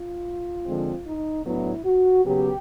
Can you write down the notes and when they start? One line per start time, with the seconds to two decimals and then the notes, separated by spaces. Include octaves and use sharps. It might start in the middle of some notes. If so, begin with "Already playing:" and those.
Already playing: F4
0.65 D3 F3 G#3 C4
1.05 D#4
1.45 A2 F#3 B3 D4 E4
1.85 F#4
2.24 C#3 F#3 B3 G4